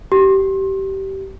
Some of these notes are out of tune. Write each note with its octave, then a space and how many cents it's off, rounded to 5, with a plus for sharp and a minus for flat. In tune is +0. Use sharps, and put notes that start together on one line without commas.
G4 -20